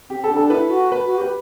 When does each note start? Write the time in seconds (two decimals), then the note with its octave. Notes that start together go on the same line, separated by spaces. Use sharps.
0.10 C4 G4
0.24 A4
0.30 D4
0.37 A4
0.50 E4 B4
0.70 F#4
0.92 B4
1.05 F#4
1.18 G4 B4